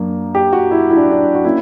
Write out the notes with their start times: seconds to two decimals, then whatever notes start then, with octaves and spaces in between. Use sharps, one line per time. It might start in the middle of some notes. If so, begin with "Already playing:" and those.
Already playing: F#2 A#3 D4
0.35 G4
0.53 F#4
0.71 E4
0.90 E4
0.96 D4
1.11 D4
1.35 F#4
1.45 A#3 C#4 E4